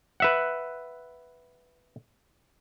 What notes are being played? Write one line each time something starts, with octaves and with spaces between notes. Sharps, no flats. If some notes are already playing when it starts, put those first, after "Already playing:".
B4 E5 F#5